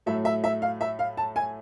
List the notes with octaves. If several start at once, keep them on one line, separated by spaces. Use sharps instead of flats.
A2 F#3 A3 E5
E5
E5
F5
E5
F5
A5
G#5